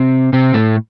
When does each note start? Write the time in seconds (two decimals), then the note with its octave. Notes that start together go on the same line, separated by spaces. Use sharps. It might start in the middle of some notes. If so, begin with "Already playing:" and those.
Already playing: C3 C4
0.33 C3 C4
0.54 A2 A3